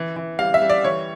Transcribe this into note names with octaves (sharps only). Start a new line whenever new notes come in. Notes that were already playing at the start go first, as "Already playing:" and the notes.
Already playing: E3
E3
G3 F5
E5
G3
D5
E3 C#5